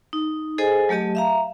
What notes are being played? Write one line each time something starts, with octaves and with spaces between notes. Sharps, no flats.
D#4
G#4 A4 C5 D#5 G#5
F#3 A3 G4 D#5 A5
E5 F5 A#5